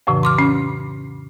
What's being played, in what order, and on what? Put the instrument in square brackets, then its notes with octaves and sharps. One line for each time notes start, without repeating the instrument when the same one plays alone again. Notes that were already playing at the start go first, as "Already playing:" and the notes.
[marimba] F2 A2 C#3 E3
C6 D6 F6
C#4